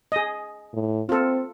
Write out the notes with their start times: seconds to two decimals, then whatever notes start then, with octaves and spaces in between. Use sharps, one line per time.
0.12 G#4 D#5
0.73 A2
1.09 C4 F4 A4